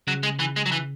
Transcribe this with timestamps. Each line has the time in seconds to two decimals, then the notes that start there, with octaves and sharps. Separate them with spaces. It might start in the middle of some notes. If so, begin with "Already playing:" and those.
0.07 C#3 F#3
0.23 G#3
0.39 E3
0.56 G#3
0.66 F#3
0.72 E3